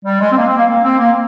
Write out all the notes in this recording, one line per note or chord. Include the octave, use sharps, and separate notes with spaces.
G3
G#3
C4
A#3
C4
A#3
A#3
C4
A#3